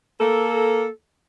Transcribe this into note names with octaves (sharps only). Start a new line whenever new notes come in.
A#3 A4